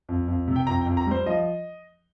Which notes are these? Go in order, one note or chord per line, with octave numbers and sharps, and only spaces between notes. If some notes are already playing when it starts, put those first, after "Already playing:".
F2
F2
C3
G5
F2 A#5
G5
F2
A#5
G3 C5
F3 D#5